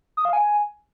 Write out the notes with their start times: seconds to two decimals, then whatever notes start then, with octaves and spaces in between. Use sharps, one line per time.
0.17 D#6
0.25 F5
0.33 G#5